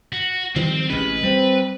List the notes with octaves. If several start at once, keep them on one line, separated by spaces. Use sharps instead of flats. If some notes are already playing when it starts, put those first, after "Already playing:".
F#4
D#3 F3 G3 C4
A1 C3 G#3 C#4 B4
G3 C4